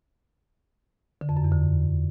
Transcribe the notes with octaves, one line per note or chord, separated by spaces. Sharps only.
D3
F2
F#2
E2
D3